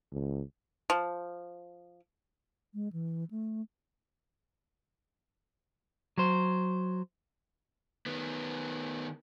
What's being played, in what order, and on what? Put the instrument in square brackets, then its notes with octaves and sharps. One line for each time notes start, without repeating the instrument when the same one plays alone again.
[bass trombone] C#2
[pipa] F3
[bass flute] G#3
E3
A3
[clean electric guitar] F#3 C5
[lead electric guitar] D#3 B3